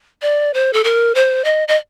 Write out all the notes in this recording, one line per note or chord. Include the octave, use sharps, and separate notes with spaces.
D5
C5
A4
A#4
C5
D#5
D#5